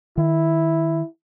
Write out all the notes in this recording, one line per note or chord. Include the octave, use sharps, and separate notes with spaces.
D#3 E4